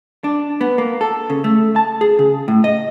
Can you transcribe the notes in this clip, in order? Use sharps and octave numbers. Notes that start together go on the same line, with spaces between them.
D4
B3
A#3
A4
C#3
A3
A5
G#4
C#3
A2
D#5